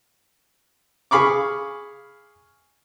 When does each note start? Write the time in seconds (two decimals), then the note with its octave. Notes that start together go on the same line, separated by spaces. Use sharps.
1.11 G#4 F5 B5 C#6 D6